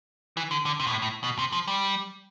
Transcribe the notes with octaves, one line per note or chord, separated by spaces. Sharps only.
E3
D3
D3
C3
B2
A2
A2
B2
C3
F3
G3